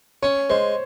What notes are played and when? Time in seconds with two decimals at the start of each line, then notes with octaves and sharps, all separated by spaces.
0.22 C#4 C#5
0.50 G#3 C5